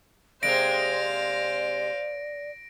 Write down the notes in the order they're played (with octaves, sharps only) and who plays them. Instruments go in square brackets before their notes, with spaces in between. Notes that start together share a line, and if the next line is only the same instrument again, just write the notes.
[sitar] C3 G#3 A#3 [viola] C5 F5 [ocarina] D5 [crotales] A#6 D7